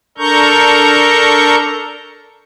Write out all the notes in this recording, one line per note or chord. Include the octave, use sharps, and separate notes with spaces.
D4 A4 A#4 A#5 C#6 G6